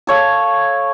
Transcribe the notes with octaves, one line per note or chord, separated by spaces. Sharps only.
A4 C#5 F5